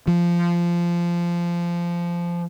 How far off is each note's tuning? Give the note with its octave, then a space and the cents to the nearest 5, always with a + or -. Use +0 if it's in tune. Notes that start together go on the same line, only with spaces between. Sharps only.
F3 -15